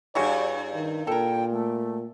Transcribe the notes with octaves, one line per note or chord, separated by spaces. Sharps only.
G2 G3 E4 F#4 G#4 C#5
D#3
A#2 A4 A#4 G5
A3